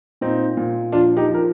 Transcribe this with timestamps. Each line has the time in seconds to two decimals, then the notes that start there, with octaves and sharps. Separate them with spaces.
0.21 A#2 C4 D#4
0.57 A#2
0.92 F3 D4 F4
1.17 D#4 G4
1.28 F3
1.34 A#4